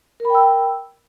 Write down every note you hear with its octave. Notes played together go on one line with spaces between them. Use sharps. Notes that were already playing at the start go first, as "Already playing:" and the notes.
A#4 G5 B5 E6